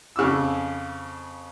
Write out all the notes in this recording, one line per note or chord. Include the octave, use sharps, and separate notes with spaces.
F2 C#3 D6 E6